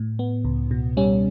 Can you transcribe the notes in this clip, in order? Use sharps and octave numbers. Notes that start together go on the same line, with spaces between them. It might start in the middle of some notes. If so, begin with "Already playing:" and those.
Already playing: A2
B3
C#2
B2
G3 C#4